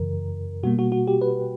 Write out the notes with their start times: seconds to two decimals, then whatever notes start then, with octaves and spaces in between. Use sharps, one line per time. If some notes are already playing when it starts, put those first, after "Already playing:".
Already playing: F#2 C#3 E3 A#4
0.63 B2 G3 A#3 F#4
0.79 F#4
0.92 F#4
1.07 G4
1.21 B4